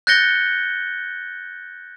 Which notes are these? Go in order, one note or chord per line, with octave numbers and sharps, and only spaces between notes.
F#6 G6 A6 A#6 C#7 G7